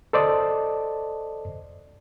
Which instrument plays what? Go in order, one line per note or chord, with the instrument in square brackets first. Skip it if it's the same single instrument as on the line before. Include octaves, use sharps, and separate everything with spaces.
[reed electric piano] A4 C5 D5 D#5 A5